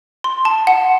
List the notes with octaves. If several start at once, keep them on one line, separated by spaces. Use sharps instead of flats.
C6
A5
F#5